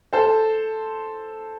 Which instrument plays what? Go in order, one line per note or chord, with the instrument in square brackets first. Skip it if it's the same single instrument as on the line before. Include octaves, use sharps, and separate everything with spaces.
[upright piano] A4 C5